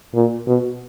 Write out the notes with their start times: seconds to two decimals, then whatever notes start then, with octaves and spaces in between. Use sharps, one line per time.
0.14 A#2
0.47 B2